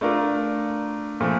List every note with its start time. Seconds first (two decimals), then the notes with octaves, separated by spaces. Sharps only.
0.01 A3 D4 F4 A#4
1.20 A#2 F3 A3